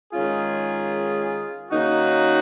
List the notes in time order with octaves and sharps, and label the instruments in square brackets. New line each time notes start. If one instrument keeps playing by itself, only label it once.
[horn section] D#3 G#3 C#4 F4 G#4
D#3 A#3 C#4 D#4 F#4